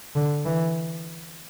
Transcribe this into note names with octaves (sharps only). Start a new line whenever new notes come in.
D3
E3